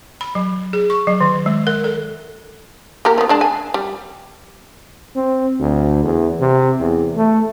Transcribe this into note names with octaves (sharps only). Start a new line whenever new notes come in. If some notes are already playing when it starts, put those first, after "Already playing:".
B5
F#3
G#4
C#6
F#3
D#3
G#3
A#4
A4
A#3 G4 A#4
F3 B3
G#3 D4 A5
G#5
G3
C4
D2
E2
C3
E2
A3